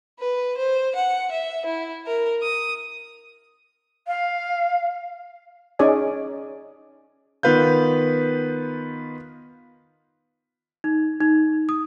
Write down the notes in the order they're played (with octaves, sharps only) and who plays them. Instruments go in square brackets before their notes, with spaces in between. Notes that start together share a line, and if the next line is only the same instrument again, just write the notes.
[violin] B4
C5
F#5
E5
E4
A#4
D#6
[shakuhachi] F5
[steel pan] C#4 D#4 G#4 C#5 D5 G#5
[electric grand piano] D#3 B3 F4 B4 F5 G6
[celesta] D#4
D#4
D#6